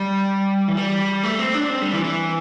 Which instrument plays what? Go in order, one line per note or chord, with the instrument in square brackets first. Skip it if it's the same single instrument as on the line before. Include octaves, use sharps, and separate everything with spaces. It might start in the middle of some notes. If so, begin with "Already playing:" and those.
Already playing: [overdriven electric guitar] G3
E3
G3
A3
C4
D4
C4
G3
E3
E3